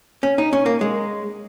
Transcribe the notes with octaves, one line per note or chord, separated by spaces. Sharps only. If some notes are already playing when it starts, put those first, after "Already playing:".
C#4
D#4
C#4
A#3
G#3